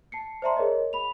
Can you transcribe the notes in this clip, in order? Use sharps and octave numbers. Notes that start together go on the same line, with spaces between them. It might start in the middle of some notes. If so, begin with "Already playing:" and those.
A5 C7 C#7
C5 D5 E5 A5 A#5 C6
G#4 A#4 C#5 D#5
B5 F7